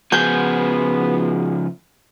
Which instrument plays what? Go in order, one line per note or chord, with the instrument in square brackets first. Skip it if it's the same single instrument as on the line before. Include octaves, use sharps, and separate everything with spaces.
[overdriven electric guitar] C#3 F3 [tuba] B3 [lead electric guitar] F#4 G#4 [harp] G6